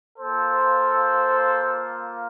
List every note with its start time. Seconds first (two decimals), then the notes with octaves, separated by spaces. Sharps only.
0.19 A#3 F4 A4 C5